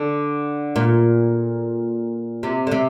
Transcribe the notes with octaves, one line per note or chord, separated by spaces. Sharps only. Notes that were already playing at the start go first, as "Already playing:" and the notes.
Already playing: D3
A#2
C3
D3
C3